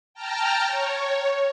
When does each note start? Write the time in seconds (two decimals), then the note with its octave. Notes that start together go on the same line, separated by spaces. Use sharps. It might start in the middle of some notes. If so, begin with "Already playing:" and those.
0.14 G5 A5 A#5 F6
0.67 C#5